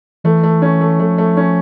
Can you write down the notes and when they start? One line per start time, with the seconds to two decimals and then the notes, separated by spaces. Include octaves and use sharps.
0.24 E3 A3
0.43 A3
0.62 C#4
0.81 A3
0.99 F3 A3
1.18 A3
1.37 C#4